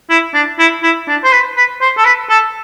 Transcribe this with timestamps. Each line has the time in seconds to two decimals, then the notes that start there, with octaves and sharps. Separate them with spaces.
0.09 E4
0.34 D4
0.59 E4
0.83 E4
1.08 D4
1.24 C5
1.32 B4
1.57 B4
1.81 C5
1.98 A4
2.05 B4
2.30 A4